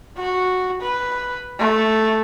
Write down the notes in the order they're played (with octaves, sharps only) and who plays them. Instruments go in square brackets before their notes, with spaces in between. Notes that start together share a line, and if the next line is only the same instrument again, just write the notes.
[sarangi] F#4
B4
A3